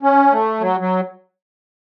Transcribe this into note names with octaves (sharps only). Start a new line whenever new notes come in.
C#4
A3
F#3
F#3